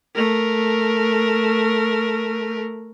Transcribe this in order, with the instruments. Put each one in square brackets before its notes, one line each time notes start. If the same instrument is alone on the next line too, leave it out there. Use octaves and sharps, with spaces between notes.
[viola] A3 A#4